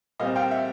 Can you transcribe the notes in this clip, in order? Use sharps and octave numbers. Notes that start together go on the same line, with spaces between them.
A#2 G3 C4 D#5 F5
F5 G5
E5 F#5